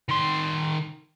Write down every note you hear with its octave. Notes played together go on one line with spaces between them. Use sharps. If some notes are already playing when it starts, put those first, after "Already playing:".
D#3 C6